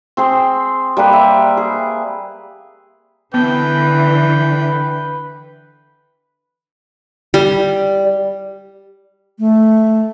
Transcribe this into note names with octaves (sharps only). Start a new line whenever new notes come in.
C4 G#4 C5
G3 A#3 B4
E5
G#4
D3 E3 B3 B4 G5
G3
A3